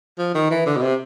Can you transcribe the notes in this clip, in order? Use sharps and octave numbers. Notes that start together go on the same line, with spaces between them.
F3
D#3
E3
D3
B2
C3